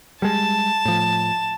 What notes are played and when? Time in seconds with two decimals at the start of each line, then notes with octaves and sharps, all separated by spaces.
0.22 G3 G#3 A5
0.85 A2 F3